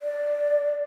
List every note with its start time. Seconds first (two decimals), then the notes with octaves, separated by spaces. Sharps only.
0.02 D5